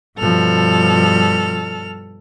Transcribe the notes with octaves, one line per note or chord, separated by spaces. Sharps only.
G2 B2 F3 A4 F6